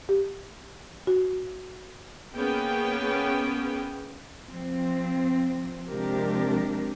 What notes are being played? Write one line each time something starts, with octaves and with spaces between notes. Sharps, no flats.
G4
F#4
A#3 B3 C#4 G#4 G5
F3 C4
C3 F3 G#3 D4 G4 A#4